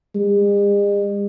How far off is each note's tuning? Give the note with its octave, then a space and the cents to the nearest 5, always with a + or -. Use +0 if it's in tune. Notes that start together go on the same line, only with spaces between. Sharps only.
G#3 -45